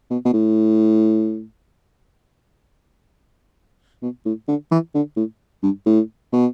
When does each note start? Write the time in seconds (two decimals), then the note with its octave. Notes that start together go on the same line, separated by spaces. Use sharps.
0.11 B2
0.25 B2
0.33 A2
4.02 B2
4.26 A2
4.48 D3
4.71 E3
4.95 D3
5.16 A2
5.63 G2
5.86 A2
6.32 B2